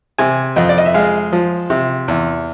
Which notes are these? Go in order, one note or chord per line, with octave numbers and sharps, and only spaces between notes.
C3 G#5
F2 D#5
D5
D#5
E5
G#3 F5
F3
C3
E2